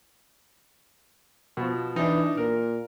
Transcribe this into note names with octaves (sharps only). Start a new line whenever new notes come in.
B2 F3
E3 D4 D#4
A#2 A#4